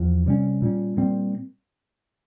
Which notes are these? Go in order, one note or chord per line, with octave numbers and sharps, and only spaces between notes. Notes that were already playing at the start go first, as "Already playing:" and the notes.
Already playing: E2 F3
C3 G3 C#4
A#2 G3 C#4
A#2 G3 C4